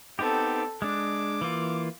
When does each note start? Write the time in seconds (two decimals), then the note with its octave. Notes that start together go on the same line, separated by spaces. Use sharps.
0.19 B3 C4 D#4 G4 A4
0.82 G#3 D4 D6
1.41 E3 A#3 F4